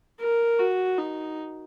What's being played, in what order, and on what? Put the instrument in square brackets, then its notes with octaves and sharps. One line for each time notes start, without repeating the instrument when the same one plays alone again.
[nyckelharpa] A#4
F#4
D#4